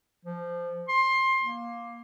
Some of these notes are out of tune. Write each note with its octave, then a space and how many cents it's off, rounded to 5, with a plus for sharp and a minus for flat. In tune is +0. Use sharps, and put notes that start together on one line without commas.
F3 -15
C6 +20
A#3 +10